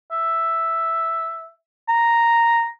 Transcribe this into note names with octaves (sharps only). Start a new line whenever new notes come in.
E5
A#5